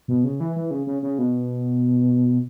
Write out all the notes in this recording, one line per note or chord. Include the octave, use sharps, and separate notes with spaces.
B2
C#3
E3
E3
C#3
C#3
C#3
B2